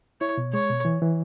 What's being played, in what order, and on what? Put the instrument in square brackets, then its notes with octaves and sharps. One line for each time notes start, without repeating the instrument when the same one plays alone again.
[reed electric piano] E4 [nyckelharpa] C#5
[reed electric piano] B2
[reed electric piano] G#3 [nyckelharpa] C#5
[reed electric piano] B2
E3
E3